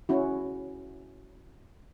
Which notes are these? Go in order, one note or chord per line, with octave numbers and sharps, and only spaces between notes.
C#4 E4 F#4